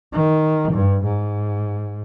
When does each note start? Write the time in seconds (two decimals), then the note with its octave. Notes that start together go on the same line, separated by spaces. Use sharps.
0.13 D#3
0.72 G2
1.04 G#2